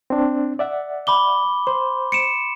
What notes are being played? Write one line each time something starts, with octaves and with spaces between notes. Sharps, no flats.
C4 D4
D5 E5 F#5
B5 D6 G7
C5 C6
C#7 D7 E7